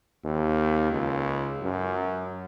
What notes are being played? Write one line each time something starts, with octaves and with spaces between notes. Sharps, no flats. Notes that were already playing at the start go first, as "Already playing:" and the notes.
D#2
C#2
F#2